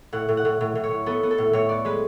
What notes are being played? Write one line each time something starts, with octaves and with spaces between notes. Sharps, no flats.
A2 F#5
A2
F#5
A2
A2
A2
C#5
A2
B3 A4
B3
A4
A2
A2 C#5
B3 D5
G#3 B4